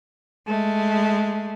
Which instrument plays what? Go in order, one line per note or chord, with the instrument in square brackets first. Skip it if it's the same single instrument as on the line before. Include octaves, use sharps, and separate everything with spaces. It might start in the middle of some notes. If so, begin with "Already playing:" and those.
[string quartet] G#3 A3